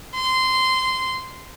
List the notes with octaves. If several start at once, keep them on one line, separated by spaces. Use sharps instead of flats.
C6